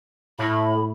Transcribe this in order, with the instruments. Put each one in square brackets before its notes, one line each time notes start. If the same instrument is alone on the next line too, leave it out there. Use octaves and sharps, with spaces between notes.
[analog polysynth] A2 [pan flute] B5